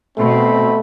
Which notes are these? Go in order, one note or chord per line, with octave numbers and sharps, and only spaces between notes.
B2 A3 C4 B5